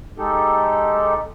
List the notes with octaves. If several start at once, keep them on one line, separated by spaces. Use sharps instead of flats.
G#3 D#4 G4 A4